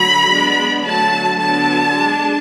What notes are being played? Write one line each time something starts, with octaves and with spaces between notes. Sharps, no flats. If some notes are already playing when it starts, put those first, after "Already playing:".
Already playing: D3 F#3 A3 B5
G#3 B3 D4
D3 F#3 A3 A5
D3 F#3 B3 A5
G#3 D4